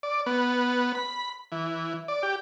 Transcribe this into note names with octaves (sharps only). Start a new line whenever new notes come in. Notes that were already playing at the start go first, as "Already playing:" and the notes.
D5
B3
B5
E3
D5
G4